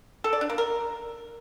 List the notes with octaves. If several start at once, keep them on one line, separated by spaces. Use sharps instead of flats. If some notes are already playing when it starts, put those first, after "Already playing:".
A4
D5
D4
A#3
A#4